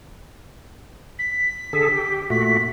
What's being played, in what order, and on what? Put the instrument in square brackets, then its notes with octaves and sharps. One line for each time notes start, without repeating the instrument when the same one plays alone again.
[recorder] B6
[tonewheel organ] D3 G#4 A4
G4
[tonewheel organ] A#2 A3 F#4 [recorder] B6